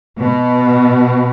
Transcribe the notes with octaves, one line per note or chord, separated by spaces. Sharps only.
B2